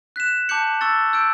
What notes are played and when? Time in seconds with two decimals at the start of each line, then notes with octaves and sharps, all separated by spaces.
0.16 F#6 B6 E7
0.49 A5 D6 G6 C#7 F#7
0.81 C#6 E6 A6 C#7
1.13 E6 G6 D7